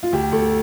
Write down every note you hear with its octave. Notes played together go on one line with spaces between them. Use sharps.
F4
D2 G4
D2 A4
A4